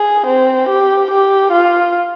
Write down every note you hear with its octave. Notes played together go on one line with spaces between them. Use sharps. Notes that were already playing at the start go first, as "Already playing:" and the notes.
Already playing: G#4
C4
G4
G4
F4